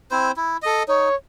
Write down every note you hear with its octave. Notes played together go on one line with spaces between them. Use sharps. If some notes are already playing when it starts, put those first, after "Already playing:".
C4 E4 C5
E4
A4 D#5
D#4 C#5